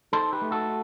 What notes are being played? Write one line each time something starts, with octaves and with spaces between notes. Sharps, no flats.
D#4 A4 C5
G4 B4
A3
F#4 A4